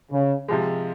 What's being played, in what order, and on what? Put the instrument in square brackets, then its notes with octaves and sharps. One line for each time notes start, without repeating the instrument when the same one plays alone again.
[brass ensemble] C#3
[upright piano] C3 F3 G#3